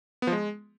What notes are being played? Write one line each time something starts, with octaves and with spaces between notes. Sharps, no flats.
B3
F3
G#3